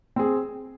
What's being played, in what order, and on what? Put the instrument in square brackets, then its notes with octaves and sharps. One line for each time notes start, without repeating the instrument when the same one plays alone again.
[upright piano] C4 G#4